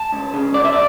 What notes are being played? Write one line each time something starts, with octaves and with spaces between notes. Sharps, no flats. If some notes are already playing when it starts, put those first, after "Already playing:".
Already playing: A5
C#2
C#3
C#2 D5
E5
D5